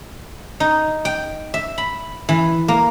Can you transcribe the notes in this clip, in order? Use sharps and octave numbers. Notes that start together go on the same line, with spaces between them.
D#4
G5
E5
B5
E3
A#3